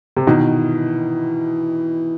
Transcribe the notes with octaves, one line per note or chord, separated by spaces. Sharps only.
C3
B2 D#3 E3